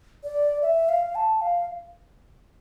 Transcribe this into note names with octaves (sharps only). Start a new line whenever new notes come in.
D5
E5
F5
A5
F5